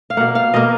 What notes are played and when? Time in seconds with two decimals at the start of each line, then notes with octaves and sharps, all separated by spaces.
0.10 F5
0.17 B2 A#3 F#5
0.35 F5
0.54 B2 A#3 D#5